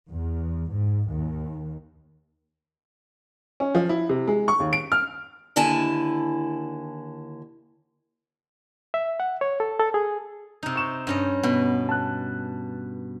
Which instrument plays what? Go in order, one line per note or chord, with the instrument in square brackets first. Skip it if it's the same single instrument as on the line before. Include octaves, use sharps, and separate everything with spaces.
[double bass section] E2
G#2
D#2
[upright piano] C#4
F3
E4
C3
G#3
C#6
D#2
D7
F6
[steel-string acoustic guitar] D#2 D3 E4 G#5 A5
[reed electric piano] E5
F#5
C#5
A4
A4
G#4
[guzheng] C3 D#4
[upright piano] C#6 E7
[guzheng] G2 C#4 D#5
[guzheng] B2 [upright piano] B3
[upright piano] A5 F#6